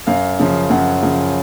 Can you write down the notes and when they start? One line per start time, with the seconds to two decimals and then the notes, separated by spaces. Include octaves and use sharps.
0.07 F#2 F5
0.40 C#3 F3
0.70 F#2 F#5
1.03 C#3 F3